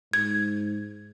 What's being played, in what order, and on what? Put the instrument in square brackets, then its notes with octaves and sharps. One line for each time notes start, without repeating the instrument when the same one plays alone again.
[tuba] G#2 [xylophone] G#6